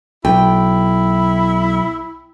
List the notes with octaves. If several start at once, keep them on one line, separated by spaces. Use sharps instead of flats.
B1 E4 G5